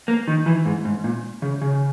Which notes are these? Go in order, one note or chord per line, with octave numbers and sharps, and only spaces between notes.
A#3
D#3
E3
G#2
G#2
A#2
C#3
C#3